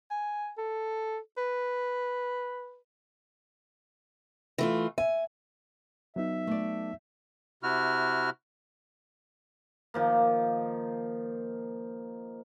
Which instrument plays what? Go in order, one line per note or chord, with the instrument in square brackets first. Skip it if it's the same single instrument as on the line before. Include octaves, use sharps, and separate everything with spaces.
[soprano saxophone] G#5
A4
B4
[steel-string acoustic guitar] E3 A3 F4
[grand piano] E5 [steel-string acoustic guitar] G#5
[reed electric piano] F#3 B3 D#4 [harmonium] E5
[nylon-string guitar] A3 D5
[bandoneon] C3 E4 F#4 F6
[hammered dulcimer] D#3 F3 A#3